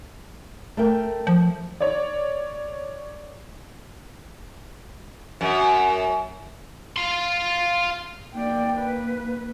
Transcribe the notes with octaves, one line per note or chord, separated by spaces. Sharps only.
A3 A#4 G5
F3
C#5 D5
F#2
F5 C6
A#3 D5 G5
B4